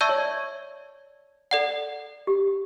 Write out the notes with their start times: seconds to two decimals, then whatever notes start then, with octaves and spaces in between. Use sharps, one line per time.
0.01 D5 E5 A5 C#6 E6 G6
0.09 C#5
0.18 D5
1.51 A4 D5 F#5
2.27 G4